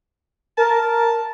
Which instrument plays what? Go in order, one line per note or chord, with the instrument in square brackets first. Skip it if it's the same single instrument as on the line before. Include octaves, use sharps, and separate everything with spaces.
[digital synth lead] A#4 [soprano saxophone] A5